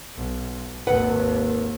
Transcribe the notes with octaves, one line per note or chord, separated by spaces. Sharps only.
B1
G#1 D#2 B4 F#5